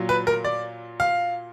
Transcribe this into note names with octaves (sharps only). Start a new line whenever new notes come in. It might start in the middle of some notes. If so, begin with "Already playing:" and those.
Already playing: A#2 F#3
B4
A#4
D5
F5